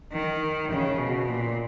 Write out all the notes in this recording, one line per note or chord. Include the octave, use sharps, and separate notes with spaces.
D#3
C#3
B2
A#2